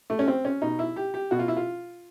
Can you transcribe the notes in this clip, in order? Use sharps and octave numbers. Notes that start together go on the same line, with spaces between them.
A3
C#4
C4
C#4
B2 D#4
E4
G4
G4
B2 F#4
F4
E4
F4